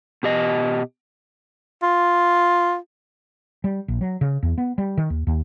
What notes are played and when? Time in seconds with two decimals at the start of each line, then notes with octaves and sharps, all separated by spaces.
0.23 B2 G4 D#5
1.83 F4
3.64 G3
3.88 A#1
4.01 F#3
4.21 C#3
4.43 E2
4.58 B3
4.78 G3
4.97 D#3
5.10 D#2
5.27 D#2